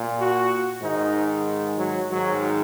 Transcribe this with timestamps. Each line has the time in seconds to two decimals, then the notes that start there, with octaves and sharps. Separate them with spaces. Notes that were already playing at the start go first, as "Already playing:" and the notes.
Already playing: A#2
0.18 F#4
0.81 G#2 D#3 D#4
1.77 F#3
2.09 G#2 D#3 F#3